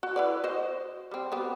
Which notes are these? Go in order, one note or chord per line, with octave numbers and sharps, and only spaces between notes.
F#4
E4 B4 D5
F#4 C5 D#5
G3 C4
B3 F#4 G4